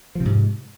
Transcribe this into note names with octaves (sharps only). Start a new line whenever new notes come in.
G#2 C3 F3